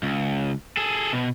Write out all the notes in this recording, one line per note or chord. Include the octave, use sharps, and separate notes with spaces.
C#2
G#4 A4
B2